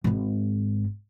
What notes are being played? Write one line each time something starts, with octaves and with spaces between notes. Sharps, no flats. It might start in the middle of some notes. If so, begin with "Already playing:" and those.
G#1 G#2